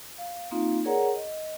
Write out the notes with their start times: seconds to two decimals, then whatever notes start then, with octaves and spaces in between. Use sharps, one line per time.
0.18 F5
0.51 A#3 C4 D#4 F4 F5
0.85 G#4 A#4 C#5 D5 F#5 A#5
1.16 D#5